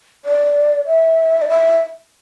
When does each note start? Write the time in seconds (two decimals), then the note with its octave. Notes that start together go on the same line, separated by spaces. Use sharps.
0.25 D5
0.86 E5
1.42 D5
1.49 E5